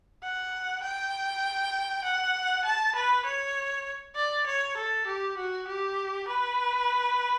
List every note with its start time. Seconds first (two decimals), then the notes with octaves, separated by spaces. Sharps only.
0.23 F#5
0.83 G5
2.04 F#5
2.64 A5
2.95 B4
3.25 C#5
4.16 D5
4.46 C#5
4.77 A4
5.06 G4
5.37 F#4
5.68 G4
6.28 B4